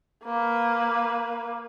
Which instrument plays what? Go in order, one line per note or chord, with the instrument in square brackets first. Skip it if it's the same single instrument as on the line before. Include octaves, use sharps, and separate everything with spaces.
[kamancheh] A#3 B4